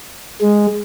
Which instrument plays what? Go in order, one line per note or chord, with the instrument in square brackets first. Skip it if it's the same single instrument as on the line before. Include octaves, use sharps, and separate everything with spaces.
[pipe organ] G#3